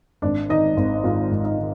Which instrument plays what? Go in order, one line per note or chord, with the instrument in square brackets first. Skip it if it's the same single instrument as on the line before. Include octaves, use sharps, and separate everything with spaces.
[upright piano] G#1 D4 D5
D#3 D#4 D#5
G#1
G#2 F4 F5
G#1
D#4 D#5
D#3